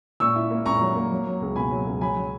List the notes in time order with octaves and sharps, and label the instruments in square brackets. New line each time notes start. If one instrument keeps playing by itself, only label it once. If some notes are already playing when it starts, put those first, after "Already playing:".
[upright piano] A#2 C#6 E6
E4
A#3
A#2 A#5 C#6
F#3
A#3
F#3
F#3
C#2
B2 G#5 B5
F#3
C#2
F#3 G#5 B5
F#3